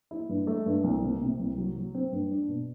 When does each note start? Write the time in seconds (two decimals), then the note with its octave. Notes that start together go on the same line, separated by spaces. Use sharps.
0.11 E4
0.29 G2
0.47 A3
0.66 G2
0.84 C2
1.02 C3
1.21 C3
1.39 C2
1.58 F#3
1.76 F#3
1.94 C4
2.12 G2
2.31 D4
2.49 B2